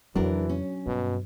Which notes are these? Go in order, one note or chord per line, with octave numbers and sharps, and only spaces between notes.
F2 C#3 E3 F#3 D4 A#4
C#4
G2 B2